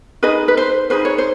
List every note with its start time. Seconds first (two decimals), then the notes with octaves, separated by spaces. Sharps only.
0.23 D#4 G#4 B4 D#5
0.48 B4
0.57 C5
0.90 D#4 G#4 B4 C5
1.05 C#5
1.18 C5